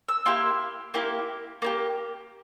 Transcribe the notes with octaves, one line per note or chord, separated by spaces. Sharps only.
E6
A#3 E4 G4 C6
A#3 E4 G4
A#3 E4 G4